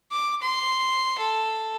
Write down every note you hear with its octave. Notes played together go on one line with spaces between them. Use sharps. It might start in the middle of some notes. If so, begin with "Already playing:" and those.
D6
C6
A4